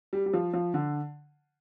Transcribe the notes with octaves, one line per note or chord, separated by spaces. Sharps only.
G3
G3
F3
F3
D3